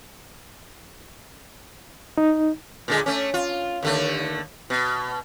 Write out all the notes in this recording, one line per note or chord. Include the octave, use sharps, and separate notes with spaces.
D#4
A#2 D3 G#3
A3 C#4
F4
D#2 D3 A3
B2